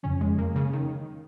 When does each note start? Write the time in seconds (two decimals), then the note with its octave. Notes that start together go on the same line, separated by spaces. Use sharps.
0.03 F2 C#3 F3 C#4
0.21 G#3
0.39 A#3
0.56 C#3
0.73 D#3